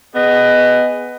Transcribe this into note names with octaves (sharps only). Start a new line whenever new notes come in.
B3 G#4 D#5